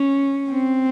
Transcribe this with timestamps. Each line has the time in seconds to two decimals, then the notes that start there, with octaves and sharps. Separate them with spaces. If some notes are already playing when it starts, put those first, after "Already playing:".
Already playing: C#4
0.50 C4